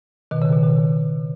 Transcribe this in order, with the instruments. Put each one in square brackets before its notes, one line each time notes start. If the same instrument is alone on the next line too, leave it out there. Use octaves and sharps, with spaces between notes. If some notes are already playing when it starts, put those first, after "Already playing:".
[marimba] B2 D#3
C#3
B2
B2 D#3